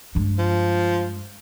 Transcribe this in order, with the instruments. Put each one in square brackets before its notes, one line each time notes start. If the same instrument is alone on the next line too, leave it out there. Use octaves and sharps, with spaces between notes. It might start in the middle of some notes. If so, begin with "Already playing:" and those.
[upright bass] G2 G#3
[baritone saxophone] F3